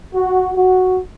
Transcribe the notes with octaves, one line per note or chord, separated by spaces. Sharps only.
F#4
F#4